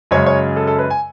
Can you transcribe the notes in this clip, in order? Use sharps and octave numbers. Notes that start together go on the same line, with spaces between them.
F#2 C#3 G#3 C#5
C#5
A4
A4
B4
G#5